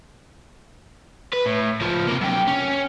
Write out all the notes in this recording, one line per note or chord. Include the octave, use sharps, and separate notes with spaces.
B4
A2
C#2 F3
C3 A#3
F#2 G4
C#4